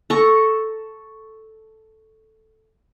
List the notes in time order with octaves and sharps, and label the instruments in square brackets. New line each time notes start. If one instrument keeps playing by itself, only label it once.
[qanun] A4 A#5 C#6